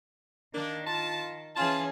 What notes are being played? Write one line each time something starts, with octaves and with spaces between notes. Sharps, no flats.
D#3 A#3 D4
F4 A5
E3 C#4 F4 G#4 A5